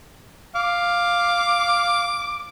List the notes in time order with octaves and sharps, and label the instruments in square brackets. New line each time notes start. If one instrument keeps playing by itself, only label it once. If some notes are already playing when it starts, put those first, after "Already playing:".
[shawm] F5 [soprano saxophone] D6